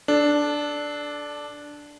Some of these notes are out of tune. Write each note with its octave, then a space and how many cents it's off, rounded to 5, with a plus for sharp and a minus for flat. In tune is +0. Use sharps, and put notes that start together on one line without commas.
D4 +0 A4 -25